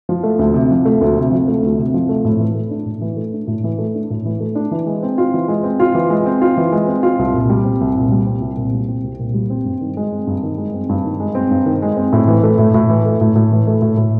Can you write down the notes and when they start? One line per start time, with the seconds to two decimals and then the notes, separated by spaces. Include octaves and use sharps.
0.09 F3
0.24 A3
0.39 D2
0.54 C3
0.71 F3
0.85 A3
1.01 D2
1.17 C3
1.31 F3
1.48 A3
1.62 D2
1.78 C3
1.94 F3
2.09 A3
2.25 A2
2.40 E3
2.55 A3
2.71 D4
2.86 A2
3.01 E3
3.17 A3
3.33 D4
3.47 A2
3.64 E3
3.78 A3
3.95 D4
4.10 A2
4.25 E3
4.40 A3
4.55 D4
4.71 E3
4.87 G#3
5.03 C4
5.18 F4
5.34 E3
5.48 G#3
5.64 C4
5.80 F4
5.95 E3
6.10 G#3
6.26 C4
6.41 F4
6.57 E3
6.72 G#3
6.87 C4
7.03 F4
7.19 C2
7.33 A#2
7.50 G3
7.64 C4
7.81 C2
7.96 A#2
8.12 G3
8.26 C4
8.42 C2
8.57 A#2
8.73 G3
8.88 C4
9.04 C2
9.19 A#2
9.34 G3
9.50 C4
9.65 G2
9.81 D#3
9.97 G#3
10.12 C4
10.27 G2
10.43 D#3
10.58 G#3
10.74 C4
10.89 G2
11.05 D#3
11.20 G#3
11.35 C4
11.51 G2
11.66 D#3
11.82 G#3
11.97 C4
12.13 A2
12.28 E3
12.44 A3
12.58 A2
12.74 A2
12.89 E3
13.06 A3
13.21 A2
13.36 A2
13.52 E3
13.67 A3
13.82 A2
13.97 A2